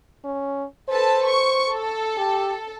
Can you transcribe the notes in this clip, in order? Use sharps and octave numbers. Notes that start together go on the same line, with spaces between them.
C#4
A4 B4 C5 A5
C#6
A4
G4